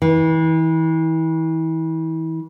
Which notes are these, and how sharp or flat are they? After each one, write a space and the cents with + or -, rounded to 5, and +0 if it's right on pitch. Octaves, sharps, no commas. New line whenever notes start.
E3 -35